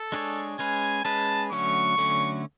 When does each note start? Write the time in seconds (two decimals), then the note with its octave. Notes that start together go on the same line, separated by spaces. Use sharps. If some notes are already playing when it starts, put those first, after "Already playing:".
Already playing: A4
0.12 G#3 D4 G#4 C#5
0.59 G#3 C#4 G#4 B4 G#5
1.05 G#3 C#4 G#4 B4 A5
1.52 D3 F#3 A3 C#4 C#6
1.98 D3 F#3 A3 C#4